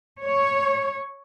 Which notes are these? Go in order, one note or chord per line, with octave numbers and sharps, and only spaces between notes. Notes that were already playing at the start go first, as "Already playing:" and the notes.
C#5